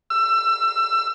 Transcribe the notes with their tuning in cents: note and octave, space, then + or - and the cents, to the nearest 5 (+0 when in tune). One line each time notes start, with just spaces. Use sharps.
E6 +25